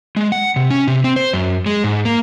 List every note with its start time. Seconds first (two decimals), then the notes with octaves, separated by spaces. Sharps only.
0.16 G#3
0.32 F#5
0.56 C3
0.70 C#4
0.88 C3
1.04 C4
1.16 C5
1.33 F#2
1.66 G#3
1.84 G#2
2.05 A#3